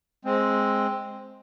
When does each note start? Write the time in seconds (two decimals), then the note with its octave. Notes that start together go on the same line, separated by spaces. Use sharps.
0.25 G#3 C4